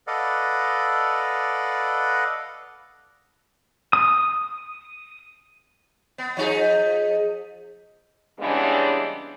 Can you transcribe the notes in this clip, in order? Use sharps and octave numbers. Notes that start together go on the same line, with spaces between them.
A4 B4 D5 D#5 F5 F#5
D#6
B3
F3 D#4 G#4
C#3 E3 G3 G#3 B3 D4